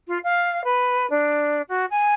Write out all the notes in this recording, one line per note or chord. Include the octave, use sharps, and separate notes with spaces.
F4
F5
B4
D4
F#4
G#5